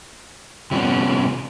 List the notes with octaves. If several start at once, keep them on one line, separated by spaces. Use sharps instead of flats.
C3 F3 G3 B3 C#4